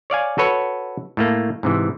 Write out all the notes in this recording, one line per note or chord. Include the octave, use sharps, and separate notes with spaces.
C#5 D5 F5 G#5
F#4 A4 B4 C#5
A2 A3 A#3
G#2 C3 E3